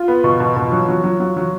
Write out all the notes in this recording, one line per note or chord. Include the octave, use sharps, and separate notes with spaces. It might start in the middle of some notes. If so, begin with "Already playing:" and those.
Already playing: F4
B3
B2
B2
B2
F#3
F#3
F#3
F#3
F#3